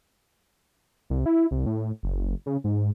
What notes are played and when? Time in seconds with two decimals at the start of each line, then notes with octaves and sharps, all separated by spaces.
1.10 C2
1.26 E4
1.51 C2
1.66 A2
2.03 F#1
2.46 C#3
2.64 G#2